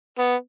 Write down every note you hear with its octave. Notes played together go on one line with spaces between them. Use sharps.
B3